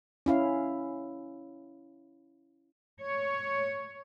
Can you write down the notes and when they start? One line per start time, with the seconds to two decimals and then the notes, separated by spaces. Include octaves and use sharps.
0.26 C#4 E4 F5
3.01 C#5